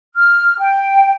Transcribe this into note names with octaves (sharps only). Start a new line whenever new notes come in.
F6
G5